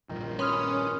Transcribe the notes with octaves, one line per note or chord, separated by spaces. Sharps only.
A#1 G2 D#3 F3
C#4 B4 C6 D#6 F6